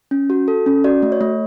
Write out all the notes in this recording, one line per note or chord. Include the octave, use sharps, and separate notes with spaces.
C#4
F#4
A4
C#4
F#4 D5
A3
C#5
A3